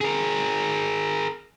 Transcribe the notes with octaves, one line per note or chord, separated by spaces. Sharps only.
G#4 A#4